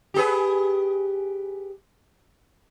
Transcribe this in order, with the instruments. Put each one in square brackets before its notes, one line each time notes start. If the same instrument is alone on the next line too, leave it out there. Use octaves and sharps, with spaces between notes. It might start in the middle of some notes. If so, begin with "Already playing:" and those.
[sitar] G4 G#4 B4